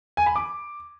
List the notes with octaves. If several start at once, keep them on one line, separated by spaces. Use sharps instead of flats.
G#5
B5
D6